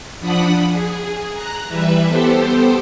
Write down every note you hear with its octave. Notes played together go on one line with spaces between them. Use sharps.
F3 D4 F#5 B5 D#6 F#6
G#4
A#5 F#6
E3 G3 B4 E5
B3 G4 A4 C5